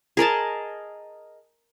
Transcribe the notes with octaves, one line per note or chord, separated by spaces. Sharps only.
G#4 A#4 D#5 A5